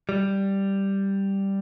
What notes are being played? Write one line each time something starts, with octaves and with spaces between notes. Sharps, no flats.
G3